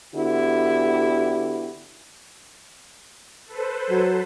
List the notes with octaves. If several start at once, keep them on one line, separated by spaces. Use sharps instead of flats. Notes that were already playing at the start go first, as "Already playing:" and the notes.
D3 B3 E4 F#4 G4
A4 B4 C5
F#3